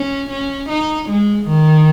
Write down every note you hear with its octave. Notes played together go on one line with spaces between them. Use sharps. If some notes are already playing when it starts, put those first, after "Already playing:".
Already playing: C#4
C#4
D#4
G#3
D#3